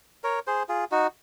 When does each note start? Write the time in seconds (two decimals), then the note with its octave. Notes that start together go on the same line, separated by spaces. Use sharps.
0.24 A#4 C#5
0.47 G#4 C5
0.69 F4 G#4
0.91 D#4 F#4